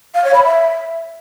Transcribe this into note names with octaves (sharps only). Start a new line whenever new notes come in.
F5
C#5
B5
E5